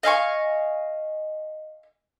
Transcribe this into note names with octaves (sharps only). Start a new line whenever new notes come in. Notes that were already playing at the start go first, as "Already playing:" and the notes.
D#5 F5 G#5 C#6